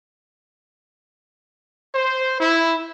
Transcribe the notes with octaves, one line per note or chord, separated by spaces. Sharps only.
C5
E4